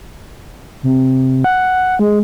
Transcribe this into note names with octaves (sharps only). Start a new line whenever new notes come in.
C3
F#5
G#3